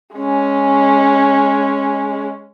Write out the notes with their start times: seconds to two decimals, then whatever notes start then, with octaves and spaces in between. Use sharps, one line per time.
0.15 G#3 C#4